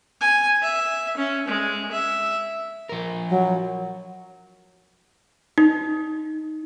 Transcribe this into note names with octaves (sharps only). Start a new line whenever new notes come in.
G#5
E5
C#4
G#3
E5
F3 A#4
F#3
D#4